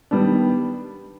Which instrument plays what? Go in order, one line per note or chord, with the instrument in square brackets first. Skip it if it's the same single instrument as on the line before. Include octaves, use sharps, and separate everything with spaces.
[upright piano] D#3 G3 B3 D4